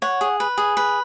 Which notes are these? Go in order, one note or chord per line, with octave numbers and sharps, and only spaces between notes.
C#5 F#5
G#4
B4
G#4
B4